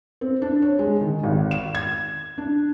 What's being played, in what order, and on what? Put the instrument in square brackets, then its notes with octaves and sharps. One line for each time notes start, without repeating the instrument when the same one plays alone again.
[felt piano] C4
D4
C#5
G#3
D#3
G#1
E7
G#6
D4